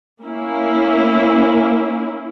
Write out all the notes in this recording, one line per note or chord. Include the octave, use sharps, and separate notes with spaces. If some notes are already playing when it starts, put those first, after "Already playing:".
A#3 C#4 E4